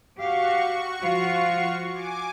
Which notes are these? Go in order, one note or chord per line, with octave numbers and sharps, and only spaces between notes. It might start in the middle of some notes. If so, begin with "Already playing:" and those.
F#4 G4 F5 C#6
F3 F4 F5
G#5 D6